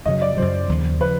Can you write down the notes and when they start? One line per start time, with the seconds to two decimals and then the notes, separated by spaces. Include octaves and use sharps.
0.06 F#2 C#3 F#3 D#5
0.22 D5
0.37 F#2 C#3 F#3 C5
0.69 D#2 C#3 F3
1.00 C#3 F3 B4